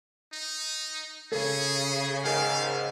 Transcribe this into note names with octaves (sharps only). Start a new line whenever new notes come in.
D#4
C#3 G#4 A4
G#2 D#3 F5 G#5